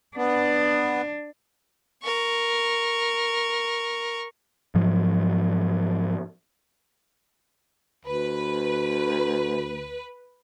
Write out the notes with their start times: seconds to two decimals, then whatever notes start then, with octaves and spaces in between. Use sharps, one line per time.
0.17 B3 D4
2.03 A#4 C#6
4.75 G#2 F3 F#3
8.05 D2 B4